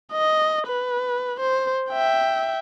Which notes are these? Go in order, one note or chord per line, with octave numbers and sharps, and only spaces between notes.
D#5
B4
C5
E5 G5